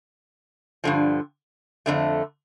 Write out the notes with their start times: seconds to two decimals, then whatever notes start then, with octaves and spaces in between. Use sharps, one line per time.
0.84 G2 D3 F3
1.86 F2 D3 A3